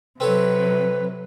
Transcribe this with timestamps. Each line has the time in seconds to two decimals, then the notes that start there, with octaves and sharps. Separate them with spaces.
0.20 C3 F#3 C4 A4 B4 C#5